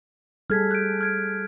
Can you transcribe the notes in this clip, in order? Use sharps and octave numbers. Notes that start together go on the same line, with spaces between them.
G3 G#4 A4 F6 G#6 B6
F#6 G6 D7
F6 G#6 D7